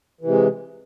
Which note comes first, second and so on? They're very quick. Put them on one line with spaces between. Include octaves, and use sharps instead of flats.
E3 C3 G#3